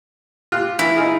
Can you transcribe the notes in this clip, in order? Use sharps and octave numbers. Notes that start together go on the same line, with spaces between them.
F4 G4 F#6
E3 E4
D#4 F4 G#4